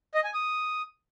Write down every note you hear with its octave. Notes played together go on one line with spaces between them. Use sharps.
D#5
G#5
D#6